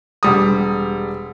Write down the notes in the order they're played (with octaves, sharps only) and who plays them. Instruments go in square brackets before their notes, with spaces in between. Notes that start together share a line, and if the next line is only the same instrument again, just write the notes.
[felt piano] E1 G3 D#6